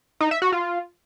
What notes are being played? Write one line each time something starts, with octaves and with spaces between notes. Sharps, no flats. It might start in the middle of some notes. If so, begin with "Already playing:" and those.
D#4
E5
F#4
F4